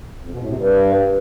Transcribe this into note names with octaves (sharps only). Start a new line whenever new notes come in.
F2
B2
A2
C3
G2